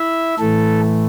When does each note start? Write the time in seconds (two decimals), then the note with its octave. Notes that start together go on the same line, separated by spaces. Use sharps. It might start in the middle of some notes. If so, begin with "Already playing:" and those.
Already playing: E4 E5
0.39 A2 E3 A3 A4